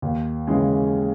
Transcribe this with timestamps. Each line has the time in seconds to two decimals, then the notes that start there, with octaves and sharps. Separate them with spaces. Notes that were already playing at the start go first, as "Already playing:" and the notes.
0.02 D#2
0.47 C#3 E3 G#3